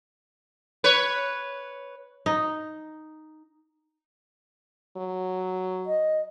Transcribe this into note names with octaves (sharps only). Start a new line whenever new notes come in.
B4 C#5
D#4
F#3
D#5